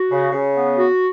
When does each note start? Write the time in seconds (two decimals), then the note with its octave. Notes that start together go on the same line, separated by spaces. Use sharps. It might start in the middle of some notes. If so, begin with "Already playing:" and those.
Already playing: F#4
0.10 C#3
0.32 C#3
0.55 B3
0.77 F#4